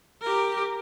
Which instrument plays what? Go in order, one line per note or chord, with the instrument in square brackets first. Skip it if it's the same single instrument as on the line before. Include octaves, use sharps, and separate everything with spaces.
[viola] G4 A#4